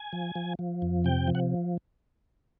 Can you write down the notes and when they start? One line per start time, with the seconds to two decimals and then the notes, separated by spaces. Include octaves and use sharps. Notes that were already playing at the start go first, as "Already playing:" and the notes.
Already playing: G#5
0.13 F3
0.35 F3
0.59 F3
0.82 F2
1.05 C3 G5
1.28 F3
1.35 F#5